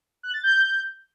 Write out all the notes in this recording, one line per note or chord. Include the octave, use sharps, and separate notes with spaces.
F#6
A6
G6